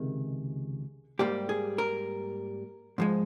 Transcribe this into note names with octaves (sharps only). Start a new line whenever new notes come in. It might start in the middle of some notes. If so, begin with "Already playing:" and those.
Already playing: C#2 C3 D#3 G#4
G#2 G3 A#3 G4
G#4
A#4
G#2 F3 G#3